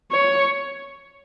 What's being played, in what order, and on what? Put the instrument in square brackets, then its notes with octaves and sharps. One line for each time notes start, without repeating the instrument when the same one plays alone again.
[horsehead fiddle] C#5